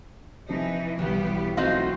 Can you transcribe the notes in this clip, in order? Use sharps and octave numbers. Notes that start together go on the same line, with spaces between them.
C3 E3 F3 D4 D#4
B1 E3 G3 B3 G4
F#3 A3 C4 D#4 F4 F#4 F5